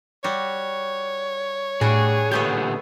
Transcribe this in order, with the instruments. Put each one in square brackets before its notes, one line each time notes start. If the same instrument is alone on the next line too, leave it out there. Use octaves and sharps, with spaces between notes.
[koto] G3 F#4 [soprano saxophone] C#5
[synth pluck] A2 [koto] G3 D4 F#4 [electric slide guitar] G#4
[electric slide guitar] A#2 D3 G4 [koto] A3 B3 G#4 [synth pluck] G6